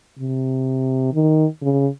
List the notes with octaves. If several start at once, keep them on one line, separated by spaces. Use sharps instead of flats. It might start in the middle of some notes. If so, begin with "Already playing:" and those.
C3
D#3
C#3